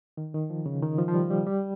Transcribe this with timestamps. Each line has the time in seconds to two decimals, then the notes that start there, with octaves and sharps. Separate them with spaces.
0.17 D#3
0.34 D#3
0.50 F3
0.66 C#3
0.82 D#3
0.98 F3
1.08 F3
1.14 G3
1.30 G3
1.47 G3